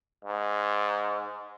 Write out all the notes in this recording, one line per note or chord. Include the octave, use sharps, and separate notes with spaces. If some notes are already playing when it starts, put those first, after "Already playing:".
G#2